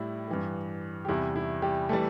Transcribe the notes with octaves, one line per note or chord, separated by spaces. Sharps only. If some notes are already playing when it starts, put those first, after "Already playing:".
Already playing: A2 G3 E4
G2 E3 G3
G4
E2 C3 G3 E4
E4
G3 G4
E3 G3 A3 A4